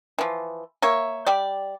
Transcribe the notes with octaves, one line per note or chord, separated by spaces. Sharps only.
E3 F3
A#3 C#5 E5
G3 G4 D5